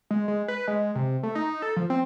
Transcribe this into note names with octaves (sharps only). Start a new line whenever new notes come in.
G#3
G#3
B4
G#3
C3
A3
D#4
A4
F3
C4